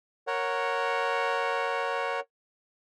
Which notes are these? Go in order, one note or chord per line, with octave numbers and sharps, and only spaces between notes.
A#4 C#5 F#5